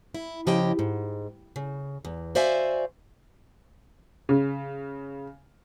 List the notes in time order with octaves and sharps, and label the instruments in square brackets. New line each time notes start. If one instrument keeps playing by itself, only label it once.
[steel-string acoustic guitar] E4
C#3 F3 E4 G4 D#5 G5
G#2
C#3
E2
F#4 C5 D5 E5 F5 G#5
[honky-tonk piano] C#3